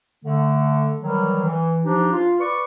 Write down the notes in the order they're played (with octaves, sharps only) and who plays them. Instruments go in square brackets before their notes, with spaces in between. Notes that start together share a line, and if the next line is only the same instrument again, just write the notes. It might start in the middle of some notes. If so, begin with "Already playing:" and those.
[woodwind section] D3 A3
D#3 E3 F#3 G3
E3
F3 D4 D#4 G4
F4
B4 D5 C#6